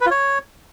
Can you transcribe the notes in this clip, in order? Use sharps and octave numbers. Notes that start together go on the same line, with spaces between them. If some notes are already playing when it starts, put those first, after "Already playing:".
B4
F4
C#5